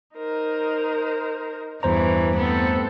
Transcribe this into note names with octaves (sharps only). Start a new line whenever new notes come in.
D#4 A#4 C5
E2 G2 E3 C5 A#5
A3 B3 C4 A4